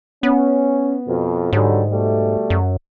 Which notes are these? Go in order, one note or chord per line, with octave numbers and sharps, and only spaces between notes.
B3 C#4
F2 B2
G#2 D3 F#3 G3
B2 G3 A3
F#2